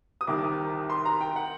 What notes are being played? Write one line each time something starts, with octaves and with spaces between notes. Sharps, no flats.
D#6
C2 C3 D#3 D6
C6
A#5
G5
F#5